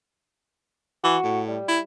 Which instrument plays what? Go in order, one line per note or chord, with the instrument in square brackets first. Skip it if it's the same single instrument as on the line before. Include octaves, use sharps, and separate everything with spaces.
[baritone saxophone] E3 [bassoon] F#4
[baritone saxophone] A2
[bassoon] G3
[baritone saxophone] E4